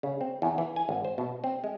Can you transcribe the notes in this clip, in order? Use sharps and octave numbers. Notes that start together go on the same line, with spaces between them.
C#3
C4
E2
E3
G#5
G#1
C5
B2
C4
G#3